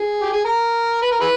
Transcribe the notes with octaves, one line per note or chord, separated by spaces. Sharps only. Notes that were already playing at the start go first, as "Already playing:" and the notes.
Already playing: G#4
G4
G#4
A#4
B4
A#4
E4 G#4 B4